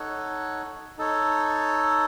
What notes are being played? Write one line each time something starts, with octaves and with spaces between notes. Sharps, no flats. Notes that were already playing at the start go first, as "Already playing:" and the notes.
Already playing: D#4 A4 C#5 F#5
D#4 A4 C#5